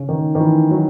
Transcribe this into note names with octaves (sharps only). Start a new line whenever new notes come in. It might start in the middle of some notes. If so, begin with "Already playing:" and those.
Already playing: C#3
D#3
D#3
E3
F#3